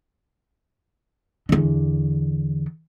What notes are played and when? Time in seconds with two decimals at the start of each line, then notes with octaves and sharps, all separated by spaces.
1.49 E2 D3